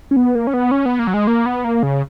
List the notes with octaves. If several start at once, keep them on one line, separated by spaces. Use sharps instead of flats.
C#4
B3
A#3
C#4
B3
C#4
B3
A#3
F#3
G#3
A#3
B3
A#3
C#3